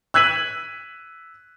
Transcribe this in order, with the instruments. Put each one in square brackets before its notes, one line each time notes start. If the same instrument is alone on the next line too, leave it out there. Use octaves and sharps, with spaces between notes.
[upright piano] E6 F#6 G#6 B6 D#7 F#7